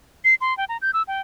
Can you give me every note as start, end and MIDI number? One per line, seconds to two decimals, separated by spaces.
0.25 0.34 96
0.41 0.56 84
0.58 0.65 79
0.69 0.77 82
0.82 0.91 91
0.94 1.03 88
1.08 1.21 79